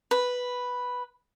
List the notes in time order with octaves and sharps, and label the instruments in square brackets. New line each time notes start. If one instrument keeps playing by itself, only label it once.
[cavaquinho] B4